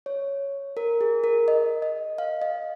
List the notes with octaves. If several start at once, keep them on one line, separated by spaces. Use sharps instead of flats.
C#5
A#4
G#4
A#4
D#5
D#5
F5
D#5